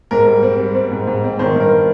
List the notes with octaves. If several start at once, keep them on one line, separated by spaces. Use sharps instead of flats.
G#2 A#4
G3
C4
G3
C4
G#2
G#2
C4
D#3 C5
G2 A#4